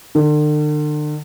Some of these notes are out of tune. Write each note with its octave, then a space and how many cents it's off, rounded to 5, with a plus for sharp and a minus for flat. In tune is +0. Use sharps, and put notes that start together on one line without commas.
D3 +40